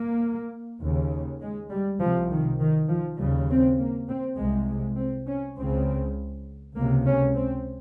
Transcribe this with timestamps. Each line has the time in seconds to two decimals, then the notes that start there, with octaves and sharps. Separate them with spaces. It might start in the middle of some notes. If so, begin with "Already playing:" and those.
Already playing: A#3
0.81 D#2 C#3
1.41 G#3
1.70 G3
2.01 C2 C3 F3
2.30 D#3
2.60 D#3
2.89 F3
3.19 D#2 C#3 G3
3.49 C4
3.78 A#3
4.08 C4
4.38 C2 C3 G#3
4.68 G#3
4.97 C4
5.27 C#4
5.56 C#2 C#3 C4
6.76 C#2 C3 A#3
7.05 C#4
7.34 C4